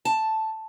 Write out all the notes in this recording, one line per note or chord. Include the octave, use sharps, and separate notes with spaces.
A5